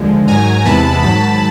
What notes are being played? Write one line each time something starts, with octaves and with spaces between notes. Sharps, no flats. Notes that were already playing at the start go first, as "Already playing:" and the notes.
Already playing: D#2 D3 F3 G#3
G#2 D#3 F#3 G#5 A#5
E2 C3 E3 G#3 B3 A5 B5
G#2 D#3 F#3 A5 B5